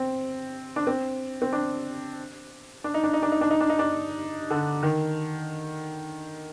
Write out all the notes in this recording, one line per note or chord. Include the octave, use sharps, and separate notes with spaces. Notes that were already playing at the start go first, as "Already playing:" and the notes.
Already playing: C4
D4
C4
C4
D4
D4
D#4
D4
D#4
D4
D#4
D4
D#4
D4
D#4
D4
D3
D#3